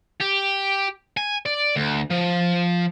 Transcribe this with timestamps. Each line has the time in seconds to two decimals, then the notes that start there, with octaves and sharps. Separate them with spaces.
0.21 G4
1.17 G#5
1.46 D5
1.76 D2
2.11 F3